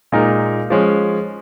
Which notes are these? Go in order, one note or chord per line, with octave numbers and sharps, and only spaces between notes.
A#2 G#3 D#4 A#4
F3 G#3 C#4